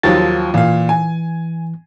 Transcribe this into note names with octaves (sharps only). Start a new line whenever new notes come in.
D#2 F3 F#3 A6
A#2 E3 F5
G#5